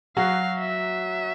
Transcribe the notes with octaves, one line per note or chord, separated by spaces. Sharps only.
F#3 F#4 F5
E5